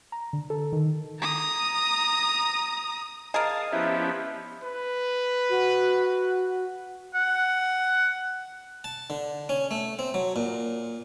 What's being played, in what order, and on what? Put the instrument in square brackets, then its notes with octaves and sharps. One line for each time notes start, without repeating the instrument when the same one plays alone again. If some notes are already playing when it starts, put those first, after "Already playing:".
[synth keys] A#5
D3
A4
D#3
[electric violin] A#5 D#6
[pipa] G#4 A#4 [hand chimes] D#5 [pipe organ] F5 A5 D#6
[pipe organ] F3 B3 B4 [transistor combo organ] C#4 E4 G4 [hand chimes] E5
[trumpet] B4
[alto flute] F#4
[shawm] F#5
[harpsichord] A5
D3
C#4
A3
C4
F#3
A#2